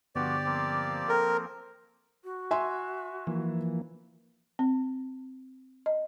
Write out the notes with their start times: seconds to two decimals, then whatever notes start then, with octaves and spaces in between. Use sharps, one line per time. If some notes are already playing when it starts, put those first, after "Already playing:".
0.16 G2 D3 F3 B3 F#4 G4 D5
0.46 F3 A#3 C4
1.09 A4 A#4 G5 F6
2.24 F#4
2.51 E5 G#5 C6
3.27 E3 F3 A#3
4.59 C4
5.86 D#5